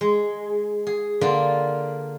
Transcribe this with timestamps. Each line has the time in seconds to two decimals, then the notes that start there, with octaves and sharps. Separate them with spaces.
0.01 G#3
0.87 G#4
1.21 D3 A#3 D4 F4